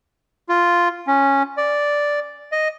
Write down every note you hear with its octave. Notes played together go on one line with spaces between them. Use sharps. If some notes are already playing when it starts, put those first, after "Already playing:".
F4
C#4
D5
D#5